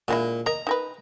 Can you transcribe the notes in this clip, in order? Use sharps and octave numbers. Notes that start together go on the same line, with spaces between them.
A#2 D3 G#3 E4
A#4 D#5 A#5
D#4 A#4 B4